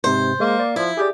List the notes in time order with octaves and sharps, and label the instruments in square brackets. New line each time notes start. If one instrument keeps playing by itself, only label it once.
[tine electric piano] G#2 C3 [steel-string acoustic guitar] C5
[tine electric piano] G#3 [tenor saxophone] A#3
[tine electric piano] D5
[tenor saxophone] F3 [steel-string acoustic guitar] E4
[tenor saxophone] G4 [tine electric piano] G#4 D5